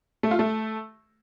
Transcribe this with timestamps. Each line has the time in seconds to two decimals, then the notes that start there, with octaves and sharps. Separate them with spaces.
0.23 A3
0.31 F4
0.39 A3